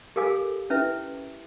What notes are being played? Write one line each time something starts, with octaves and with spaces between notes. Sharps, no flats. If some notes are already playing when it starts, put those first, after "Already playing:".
G4 A4 A#4 F5 G#5 D6
C#4 E4 B4 E5